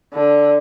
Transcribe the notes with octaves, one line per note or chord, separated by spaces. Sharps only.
D3